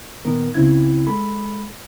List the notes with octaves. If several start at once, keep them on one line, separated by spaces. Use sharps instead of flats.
A#2 D#3 B3 A#4
C#2 C#3 C4 E4 G#6
G#3 A4 B5